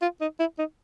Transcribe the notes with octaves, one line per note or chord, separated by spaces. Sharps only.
F4
D#4
E4
D#4